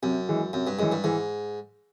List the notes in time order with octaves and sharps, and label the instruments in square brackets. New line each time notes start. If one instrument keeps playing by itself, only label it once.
[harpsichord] F#2 [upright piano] C3
[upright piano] E3 G#3
[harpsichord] F#2 [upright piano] C3
[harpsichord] G2
[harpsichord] F#2 [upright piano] E3 G#3
[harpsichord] G2
[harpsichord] G#2 [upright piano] E3